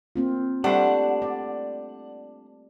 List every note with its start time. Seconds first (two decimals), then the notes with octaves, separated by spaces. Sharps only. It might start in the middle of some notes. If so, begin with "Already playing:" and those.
0.16 A#3 C4 F4
0.64 G3 A3 D4 C5 F#5
1.22 D5